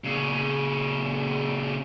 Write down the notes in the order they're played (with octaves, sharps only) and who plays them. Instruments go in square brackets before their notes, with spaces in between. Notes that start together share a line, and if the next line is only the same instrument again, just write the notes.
[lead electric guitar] A#2 C#3